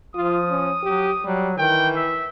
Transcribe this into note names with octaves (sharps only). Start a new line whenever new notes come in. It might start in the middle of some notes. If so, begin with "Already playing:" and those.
F3 F4 D#6
C#4
F#3 G4
F#3 G3
D#3 E3 G5
E5